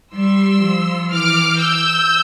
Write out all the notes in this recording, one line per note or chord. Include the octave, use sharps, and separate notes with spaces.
G3 C6 E6
F3
E3 D6 F6
E6 G6